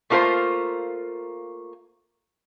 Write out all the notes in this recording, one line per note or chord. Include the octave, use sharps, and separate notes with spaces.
A3 A#3 F4 A#4 C5 F5